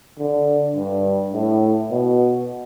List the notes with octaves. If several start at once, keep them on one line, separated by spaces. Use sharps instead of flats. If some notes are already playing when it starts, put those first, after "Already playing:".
D3
G2
A2
B2